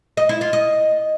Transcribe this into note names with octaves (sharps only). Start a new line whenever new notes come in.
D#5
E4
F4
D#5